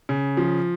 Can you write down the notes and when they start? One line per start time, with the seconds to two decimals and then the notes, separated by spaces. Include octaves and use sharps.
0.09 C#3
0.37 F3